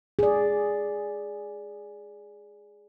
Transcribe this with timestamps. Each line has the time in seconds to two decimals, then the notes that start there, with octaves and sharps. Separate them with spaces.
0.19 G#4 D5